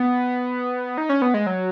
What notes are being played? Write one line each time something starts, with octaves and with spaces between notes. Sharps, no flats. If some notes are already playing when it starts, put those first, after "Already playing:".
Already playing: B3
D#4
C#4
B3
G#3
F#3